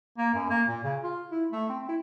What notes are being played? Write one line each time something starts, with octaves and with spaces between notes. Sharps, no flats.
A#3
F#2
A#3
A#2
C#3
F4
E4
A3
C4
E4